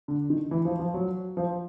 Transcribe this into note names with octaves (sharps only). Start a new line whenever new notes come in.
D3
D#3
E3
F3
F3
F#3
F3